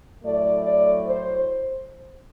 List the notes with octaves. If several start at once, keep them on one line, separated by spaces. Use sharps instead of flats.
A2 F#3 A3 D5
D5
C5